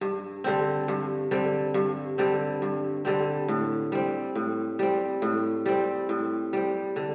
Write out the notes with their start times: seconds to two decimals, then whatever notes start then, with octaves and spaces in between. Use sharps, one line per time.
0.01 G2
0.44 D3 G3 C4
0.88 G2
1.31 D3 G3 C4
1.74 G2
2.18 D3 G3 C4
2.62 G2
3.05 D3 G3 C4
3.48 A2
3.92 G3 C4
4.35 A2
4.79 G3 C4
5.22 A2
5.66 G3 C4
6.09 A2
6.53 G3 C4
6.96 D3